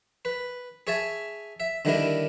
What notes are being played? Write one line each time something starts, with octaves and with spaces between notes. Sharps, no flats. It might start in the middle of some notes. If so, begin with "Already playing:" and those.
B4
G#4 C#5 E5 G#5 A5
E5
D3 D#3 G3 D4 E4 A#4